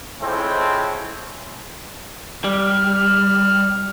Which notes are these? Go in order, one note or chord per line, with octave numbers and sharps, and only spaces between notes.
F3 G#3 A3 C4 C#4 E4
G3 F6